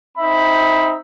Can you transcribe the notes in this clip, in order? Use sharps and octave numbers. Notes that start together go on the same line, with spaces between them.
C4 D#4 E5 B5